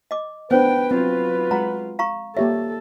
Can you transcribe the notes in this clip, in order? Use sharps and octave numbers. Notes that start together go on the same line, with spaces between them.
D#5 D6
B3 D4 B4 C5 G5
F#3 C4 F4 G5
G#3 F#5 A#5 B5
F5 A#5 C#6
A#3 G4 A4 C#5 E5